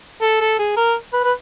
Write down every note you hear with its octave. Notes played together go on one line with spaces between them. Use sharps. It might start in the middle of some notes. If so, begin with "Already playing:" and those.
A4
A4
G#4
A#4
B4
B4